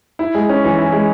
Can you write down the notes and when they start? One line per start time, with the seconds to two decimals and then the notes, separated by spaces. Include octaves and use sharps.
0.19 E4
0.35 G#3
0.49 C#4
0.64 E3
0.78 E4
0.92 G#3